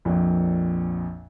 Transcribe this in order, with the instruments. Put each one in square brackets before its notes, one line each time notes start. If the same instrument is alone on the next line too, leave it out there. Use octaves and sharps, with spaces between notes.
[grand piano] A#1 F2 A#2